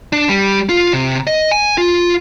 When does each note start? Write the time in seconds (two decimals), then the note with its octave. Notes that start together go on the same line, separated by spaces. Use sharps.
0.13 D4
0.29 G3
0.69 F4
0.93 C3
1.27 D#5
1.51 G#5
1.78 F4